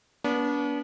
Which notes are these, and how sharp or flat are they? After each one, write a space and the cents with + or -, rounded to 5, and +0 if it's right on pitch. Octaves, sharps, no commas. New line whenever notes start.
B3 -30 D4 -35